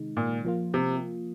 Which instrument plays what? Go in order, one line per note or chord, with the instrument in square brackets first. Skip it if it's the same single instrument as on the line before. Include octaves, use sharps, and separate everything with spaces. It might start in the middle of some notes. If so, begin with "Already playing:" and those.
Already playing: [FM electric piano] C3 D#3 G#3 D#4
[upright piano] A#2
[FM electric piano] F3 A#3 F4
[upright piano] C3